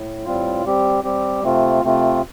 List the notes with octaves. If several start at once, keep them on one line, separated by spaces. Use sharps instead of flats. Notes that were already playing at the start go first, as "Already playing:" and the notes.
Already playing: A2
A2 G3 C4 F4
G3 C4 G4
G3 C4 G4
C3 A3 C4 F4
C3 A3 C4 F4